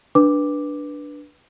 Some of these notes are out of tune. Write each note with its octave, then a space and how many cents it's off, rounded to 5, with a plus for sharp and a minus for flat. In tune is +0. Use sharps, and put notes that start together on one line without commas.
D4 +0 B4 -15 D6 +0